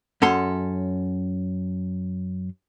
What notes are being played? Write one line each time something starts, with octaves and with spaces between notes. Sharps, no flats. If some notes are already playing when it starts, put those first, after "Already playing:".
F#2 C#4 A4 C6